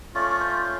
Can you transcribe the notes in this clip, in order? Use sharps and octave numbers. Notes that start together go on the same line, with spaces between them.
A3 C#4 F4 D5
C5